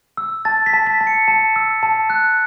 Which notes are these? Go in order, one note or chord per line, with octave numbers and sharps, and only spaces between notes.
E6
A5 A6
B6
A5
B6
A5
C#7
A5
E6
A5
F#6